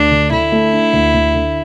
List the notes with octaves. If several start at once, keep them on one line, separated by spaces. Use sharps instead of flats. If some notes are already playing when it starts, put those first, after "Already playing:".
Already playing: D2 D4
D3
D3 E4
A3
D4
D2
D2
D3